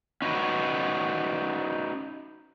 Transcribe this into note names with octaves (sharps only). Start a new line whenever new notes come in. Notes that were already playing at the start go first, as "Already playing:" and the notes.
C#4 D#4 F#4 B4